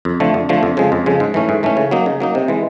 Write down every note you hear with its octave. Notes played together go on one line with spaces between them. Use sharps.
F2
D3 F3 A3
F2
D3 F3 A3
F2
C#3 F3 G#3
F2
C#3 F3 G#3
G#2
E3 A3 C#4
G#2
E3 A3 C#4
C#3
F#3 A#3 D#4
C#3
F#3 A#3 D#4
C3
E3 G#3